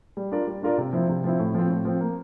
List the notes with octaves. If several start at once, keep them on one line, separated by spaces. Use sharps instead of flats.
G3
D4 F4 A#4 D5
G3
D4 F4 A#4 D5
C3
F3 C4 E4
C3
F3 C4 E4
A2
F3 C4
A2
F3 C4
A#3